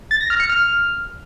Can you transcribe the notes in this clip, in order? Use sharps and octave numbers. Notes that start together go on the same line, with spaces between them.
A6
A#6
F6
C#7
F6